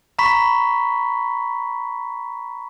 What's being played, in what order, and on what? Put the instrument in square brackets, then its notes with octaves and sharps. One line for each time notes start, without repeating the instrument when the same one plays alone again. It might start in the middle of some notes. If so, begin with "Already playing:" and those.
[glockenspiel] A#5 B5 C#6 B6